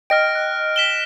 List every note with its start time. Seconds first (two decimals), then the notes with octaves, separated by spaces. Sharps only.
0.10 D#5 G5 F6 A#6 D7
0.35 F#6
0.76 B6 E7 G7